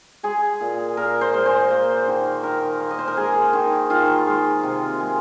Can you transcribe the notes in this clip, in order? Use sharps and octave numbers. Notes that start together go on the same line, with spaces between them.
G#3 G#4
A#2
A#2 A#4
C5
G#3
C5
A#3
D#3
D#3 A#4
A#3
D#5
C5
A#4
G#3 G#4
D#3
D#3 F4
G#3
C3
G#3